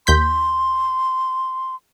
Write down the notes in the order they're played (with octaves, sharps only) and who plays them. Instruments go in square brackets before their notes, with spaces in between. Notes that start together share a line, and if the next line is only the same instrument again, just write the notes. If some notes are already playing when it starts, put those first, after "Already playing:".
[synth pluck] D#2 G6 B6 [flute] C6